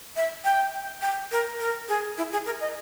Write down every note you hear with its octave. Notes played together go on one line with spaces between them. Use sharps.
E5
G5
G5
A#4
A#4
G#4
E4
G#4
A#4
D#5